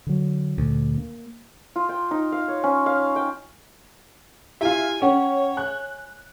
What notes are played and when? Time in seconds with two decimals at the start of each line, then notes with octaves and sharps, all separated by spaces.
0.07 D3 F#3
0.58 D2 A#2
0.98 A#3
1.76 F4
1.89 G5
2.11 D#4
2.32 F5
2.48 C#5
2.64 C#4
2.86 F5
3.16 G5
4.61 E4 F4 G4 E5 G#5
5.02 C#4 C#5 F#5 G5 C#6
5.57 G#5 F#6